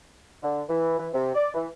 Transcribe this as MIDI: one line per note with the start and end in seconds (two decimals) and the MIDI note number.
0.43 0.62 50
0.69 0.95 52
0.98 1.08 52
1.13 1.35 48
1.35 1.50 74
1.54 1.68 52